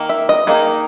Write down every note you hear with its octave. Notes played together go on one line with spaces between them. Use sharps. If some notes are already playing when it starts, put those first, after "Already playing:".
Already playing: D#3 A#3
E5
D#5
D#3 A#3 D#4 G#4